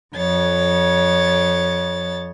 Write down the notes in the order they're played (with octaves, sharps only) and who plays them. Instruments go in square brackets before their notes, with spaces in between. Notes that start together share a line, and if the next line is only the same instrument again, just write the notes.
[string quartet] F2 C#5 A6